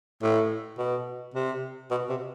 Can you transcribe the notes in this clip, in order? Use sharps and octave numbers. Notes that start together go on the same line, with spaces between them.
A2
B2
C3
B2
C3